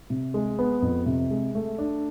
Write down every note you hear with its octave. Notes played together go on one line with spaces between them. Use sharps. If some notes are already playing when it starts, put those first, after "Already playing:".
C3
G#3
B3
F2
C3
G#3
A3
D4